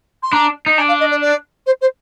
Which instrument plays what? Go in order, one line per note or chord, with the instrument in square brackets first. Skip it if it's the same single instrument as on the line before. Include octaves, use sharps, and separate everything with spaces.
[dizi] C6
[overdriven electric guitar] D4 [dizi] A#5
[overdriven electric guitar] D#4
[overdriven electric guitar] D4 [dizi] G#5
[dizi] F5
D#5
D5
D5
C5
C5